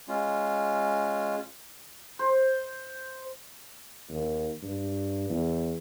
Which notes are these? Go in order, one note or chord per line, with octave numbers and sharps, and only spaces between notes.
G#3 C#4 F4
C5
D#2
G2
E2